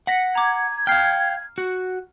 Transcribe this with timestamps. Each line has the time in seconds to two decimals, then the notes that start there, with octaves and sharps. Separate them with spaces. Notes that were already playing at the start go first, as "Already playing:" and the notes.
0.07 F#5 A#6 B6 C#7
0.35 A#5 D6 G#6
0.87 F5 G5 F6 C7
1.58 F#4